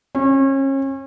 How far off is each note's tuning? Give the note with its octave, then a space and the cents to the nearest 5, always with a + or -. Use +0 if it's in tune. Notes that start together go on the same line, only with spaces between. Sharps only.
C#4 -35